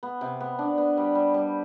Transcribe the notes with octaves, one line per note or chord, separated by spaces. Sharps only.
B3
C3
B3
D4
B3
G3
G3
G3